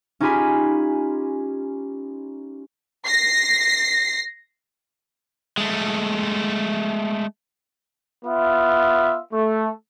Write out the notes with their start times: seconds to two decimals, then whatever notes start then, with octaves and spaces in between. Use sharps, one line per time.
0.20 C#4 D#4 F4 G4 G#5 B5
3.06 A#6 C7
5.58 G#3 A3
8.25 B3 F4 E5
9.33 A3